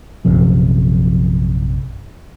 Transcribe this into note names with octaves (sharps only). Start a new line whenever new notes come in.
A#1 F#2 C3 F3